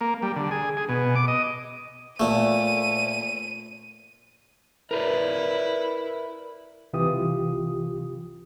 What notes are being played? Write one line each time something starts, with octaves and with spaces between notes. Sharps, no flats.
A#3
G3
D3
G#4
G#4
B2
D6
D#5
A#2 A3 D#7
E4 A#4 B4 D5
C2 C3 E3 F4 G4 D#6